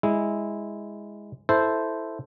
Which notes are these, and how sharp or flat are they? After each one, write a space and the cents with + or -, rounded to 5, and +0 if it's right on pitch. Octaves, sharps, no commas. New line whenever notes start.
G#3 -10 E4 -10
E4 +0 A4 +0 C5 -5